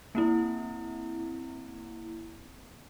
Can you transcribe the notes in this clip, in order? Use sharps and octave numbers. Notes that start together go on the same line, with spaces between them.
A#3 C4 E4